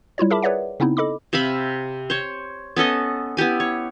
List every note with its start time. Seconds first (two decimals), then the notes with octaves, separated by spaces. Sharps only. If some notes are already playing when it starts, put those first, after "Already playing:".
0.18 G3 E4 F4 C#5
0.30 G#4 A#4 E5 A5 B5 D6
0.42 G#4 B4 C#5 D5 E5 F#5
0.80 C#3 B3 C4 D#4 E4
0.97 A4 D#5 B5 D6
1.33 C3 E5 F5 B5
2.10 C5 C#5
2.77 B3 C#4 A4 D#5
3.37 B3 E4 G4 G#5
3.60 C#5